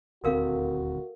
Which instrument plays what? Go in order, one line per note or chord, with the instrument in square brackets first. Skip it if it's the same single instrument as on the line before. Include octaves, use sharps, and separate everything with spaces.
[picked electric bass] D#1 D2 C4 [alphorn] F#4 [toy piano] A4 A#4 F5